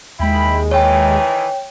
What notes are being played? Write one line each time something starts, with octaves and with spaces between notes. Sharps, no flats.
D#2 G#3 E4 G5 B5
D#3 E3 C#5 G5